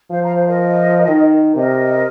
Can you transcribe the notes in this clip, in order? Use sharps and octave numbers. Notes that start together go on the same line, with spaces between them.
F3 C5 F5
F5 A#5
C5 F5
A#4 D#5
D#3
C3 A#4 D#5